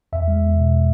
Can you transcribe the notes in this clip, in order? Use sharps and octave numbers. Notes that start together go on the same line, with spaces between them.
E2 E5
G#3
E2
B2